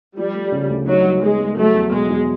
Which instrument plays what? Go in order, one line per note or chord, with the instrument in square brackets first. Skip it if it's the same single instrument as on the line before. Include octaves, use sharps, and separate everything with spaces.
[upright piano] F3 [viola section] G3
[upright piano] A3
C#3
D2
[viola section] F#3 [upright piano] D#4
[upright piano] G3
[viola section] G#3 [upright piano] B3
[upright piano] G3
[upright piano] F#3 [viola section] A3
[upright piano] E2
[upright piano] B2 [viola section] G#3
[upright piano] E2